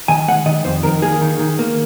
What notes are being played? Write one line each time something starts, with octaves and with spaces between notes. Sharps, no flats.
D#3 G#5
G#3 F#5
D#3 D#5
F2 C5
D#3 A#4
A#3 G#4
D#3
D#3
A#3